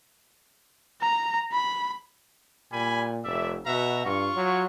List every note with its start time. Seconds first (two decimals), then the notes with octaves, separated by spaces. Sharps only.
1.01 A#5
1.52 B5
2.72 A#2 G3 G#5 B5
3.24 F1 D5 E5
3.66 B2 F#4 E5 A#5
4.05 G2 F4 C#6
4.35 F#3